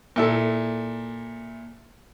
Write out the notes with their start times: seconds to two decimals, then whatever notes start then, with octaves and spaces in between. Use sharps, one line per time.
0.16 A#2 E4 A4